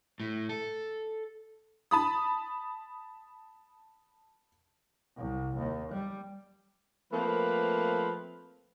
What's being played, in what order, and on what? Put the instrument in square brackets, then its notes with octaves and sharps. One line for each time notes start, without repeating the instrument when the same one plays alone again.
[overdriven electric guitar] A2
A4
[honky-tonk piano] A5 B5 D#6
[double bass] C2
D#2
G3
[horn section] F3 A3 A#3 C4 B4